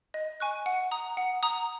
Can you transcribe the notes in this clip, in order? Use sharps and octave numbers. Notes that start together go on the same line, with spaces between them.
D#5
G#5 C#6 F#6
F#5
A#5 D#6
F#5
A#5 D#6